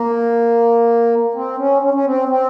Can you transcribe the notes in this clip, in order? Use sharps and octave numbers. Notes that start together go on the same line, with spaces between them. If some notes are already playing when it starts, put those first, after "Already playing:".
Already playing: A#3
C4
C#4
C#4
C#4
C4
C4